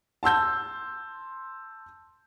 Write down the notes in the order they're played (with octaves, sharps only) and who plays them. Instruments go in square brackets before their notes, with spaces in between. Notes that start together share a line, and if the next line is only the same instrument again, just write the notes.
[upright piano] A5 C6 E6 G6